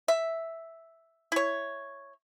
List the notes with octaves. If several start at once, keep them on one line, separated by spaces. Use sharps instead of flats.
E5
E4 C#5